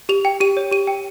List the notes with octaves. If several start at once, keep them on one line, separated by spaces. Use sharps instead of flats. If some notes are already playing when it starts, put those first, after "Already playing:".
G4 F7
G5
G4 D#7
C#5
G4 D#7
G5